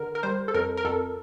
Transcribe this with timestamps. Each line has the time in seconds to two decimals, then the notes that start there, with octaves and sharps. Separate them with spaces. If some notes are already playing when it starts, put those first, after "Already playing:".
Already playing: D3 A#4
0.15 A#4
0.23 G3 C5
0.48 A4
0.54 F2 A#4
0.77 A#4
0.85 F2 A4